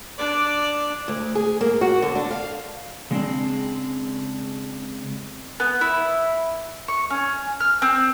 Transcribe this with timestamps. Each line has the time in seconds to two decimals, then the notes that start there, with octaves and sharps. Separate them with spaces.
0.18 D4 D5
1.08 D2
1.35 G#4
1.61 A#3
1.81 F#4
2.02 D3
2.15 D4
2.31 F5
3.11 C#3 G#3 C4 D4
5.60 B3
5.81 E4
6.88 C#6
7.10 C#4
7.60 F6
7.82 C4